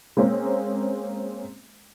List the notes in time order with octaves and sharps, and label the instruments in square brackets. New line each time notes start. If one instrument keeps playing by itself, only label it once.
[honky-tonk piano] G#3 A#3 C4 C#4